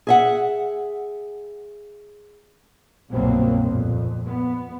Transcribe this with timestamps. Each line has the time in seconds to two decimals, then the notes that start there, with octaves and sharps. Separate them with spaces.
0.07 G#4 E5 F#5
3.11 G1 C2 B2 F#3 A#3 C4
3.63 F2 A#2
4.25 B3